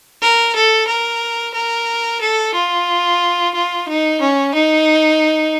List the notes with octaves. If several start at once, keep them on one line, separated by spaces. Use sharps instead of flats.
A#4
A4
A#4
A#4
A4
F4
F4
D#4
C#4
D#4